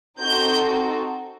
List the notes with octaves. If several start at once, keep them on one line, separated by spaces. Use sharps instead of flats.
C4 D#4 F#4 A4 G6